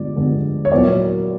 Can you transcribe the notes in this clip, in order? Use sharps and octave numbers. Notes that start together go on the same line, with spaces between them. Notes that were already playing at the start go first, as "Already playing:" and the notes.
Already playing: G2 D3 F3 G#3 B3 D5
G2 D3 F3 G#3 B3
C#5
A#2 F#3 B3 E4 D5